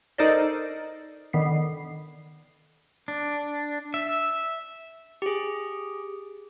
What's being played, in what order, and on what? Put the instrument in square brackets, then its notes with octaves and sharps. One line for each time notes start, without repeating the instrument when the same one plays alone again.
[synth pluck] D#4 A4 A#4 C5 D5 D#5
D3 D#3 B3 C7
[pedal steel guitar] D4
E5
[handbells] G4 G#4